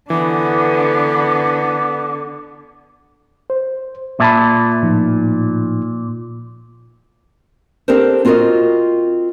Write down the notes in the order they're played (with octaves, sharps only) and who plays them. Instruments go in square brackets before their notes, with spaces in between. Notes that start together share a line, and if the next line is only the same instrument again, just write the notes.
[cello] D3 [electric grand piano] E3 [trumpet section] B3 [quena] D6
[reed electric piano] C5
[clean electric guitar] A#2 [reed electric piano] E5 A5 B5
[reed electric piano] A2 F3 D#4
[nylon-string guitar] C4 D4 G4 A4 A#4 C5
C4 F4 F#4 A4 A#4 D#5